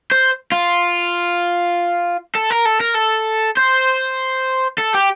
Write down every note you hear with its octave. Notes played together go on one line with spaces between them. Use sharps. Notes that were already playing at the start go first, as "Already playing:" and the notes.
C5
F4
A4
A#4
A4
A#4
A4
C5
A4
G4